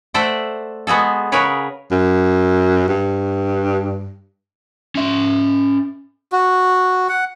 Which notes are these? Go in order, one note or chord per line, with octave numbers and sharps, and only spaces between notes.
A3 A4 C5 D5 E5 F#5
G#3 B3 F#4 G#4 A4
C#3 F#4 G#4 A#4 B4 C#5
F#2
G2
C#4 E5
F#4
F#5